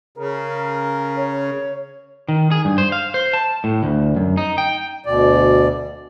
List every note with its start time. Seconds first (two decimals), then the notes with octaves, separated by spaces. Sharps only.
0.18 C#3 A#4
1.16 C#5
2.29 D#3
2.51 G#4
2.65 G2
2.78 C5
2.92 F5
3.14 C5
3.33 A5
3.64 A2
3.83 D2
4.16 F#2
4.37 D#4
4.58 G5
5.06 D2 B2 D5